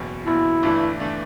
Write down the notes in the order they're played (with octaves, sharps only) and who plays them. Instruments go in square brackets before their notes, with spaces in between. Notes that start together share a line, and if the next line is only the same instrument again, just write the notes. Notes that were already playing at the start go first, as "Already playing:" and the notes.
Already playing: [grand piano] F#1 E2 B2
[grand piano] F#1 E2 B2 [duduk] E4
[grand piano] G1 G2 E3 A3 D4
E3 A3 D4